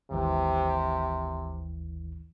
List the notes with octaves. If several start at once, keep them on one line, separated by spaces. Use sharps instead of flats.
G#1 D#2 C3 E3